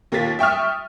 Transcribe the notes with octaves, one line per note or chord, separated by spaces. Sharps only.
D#2 A#3 F4 A6 B6
E5 G5 C#6 D#6 F6